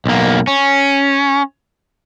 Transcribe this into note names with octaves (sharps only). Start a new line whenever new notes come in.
B1 A#3
C#4